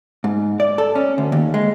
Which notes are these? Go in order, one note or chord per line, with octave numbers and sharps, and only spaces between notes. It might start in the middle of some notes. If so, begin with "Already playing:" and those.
G#2
D5
A4
C#4
D2
D#2
G#3